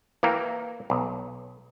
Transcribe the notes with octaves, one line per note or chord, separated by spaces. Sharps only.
E3 A#3 G5 A#5
B1